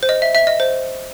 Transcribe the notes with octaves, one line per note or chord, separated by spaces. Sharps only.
C5
D#5
E5
E5
D#5
C5